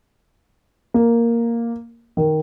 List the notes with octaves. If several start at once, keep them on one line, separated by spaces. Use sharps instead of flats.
A#3
D#3